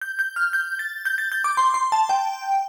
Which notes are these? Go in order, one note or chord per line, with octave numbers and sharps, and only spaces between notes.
G6
G6
F6
G6
A6
G6
A6
G6
D6
C6
C6
A5
G5